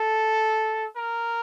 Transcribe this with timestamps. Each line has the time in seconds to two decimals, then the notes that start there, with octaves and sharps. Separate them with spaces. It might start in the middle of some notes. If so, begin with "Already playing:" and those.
Already playing: A4
0.96 A#4